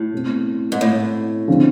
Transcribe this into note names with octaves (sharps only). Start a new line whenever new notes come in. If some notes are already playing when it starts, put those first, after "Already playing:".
Already playing: A2
B2 A3 C4
G#2
A2
D3 F3 G#3 C4